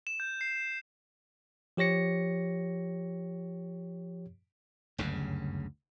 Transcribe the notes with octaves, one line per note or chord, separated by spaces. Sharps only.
E7
G6
C7
F3 G4 C#5 A#6 C#7
F#1 D2 G2 C#3